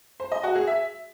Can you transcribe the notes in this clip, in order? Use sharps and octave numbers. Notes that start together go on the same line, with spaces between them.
C5
D#5
F#4
G#4
E5